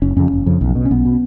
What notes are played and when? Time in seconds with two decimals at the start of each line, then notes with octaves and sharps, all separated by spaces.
0.02 F#1 C#4
0.16 F2 C#3 C#4
0.32 F#1
0.46 F2 C#3
0.61 B1
0.75 B2
0.85 C#4
0.91 B1 B3
1.05 B2